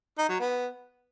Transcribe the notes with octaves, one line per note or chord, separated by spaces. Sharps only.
D#4
F#3
B3